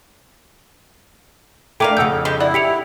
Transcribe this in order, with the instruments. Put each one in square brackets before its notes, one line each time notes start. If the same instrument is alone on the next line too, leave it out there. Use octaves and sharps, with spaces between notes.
[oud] A3 D4 [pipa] E4 A#4 F5 [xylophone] G5 D6 D#7
[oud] F2 C#3 [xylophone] F#5 E6 G6
[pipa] G3 G#3 G4
[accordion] E4 [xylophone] D5 [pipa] F#5
[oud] G4 [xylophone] B6 C#7 F7